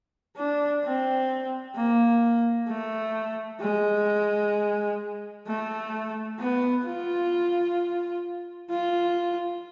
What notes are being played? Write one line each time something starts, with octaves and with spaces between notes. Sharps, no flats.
D4
C4
A#3
A3
G#3
A3
B3
F4
F4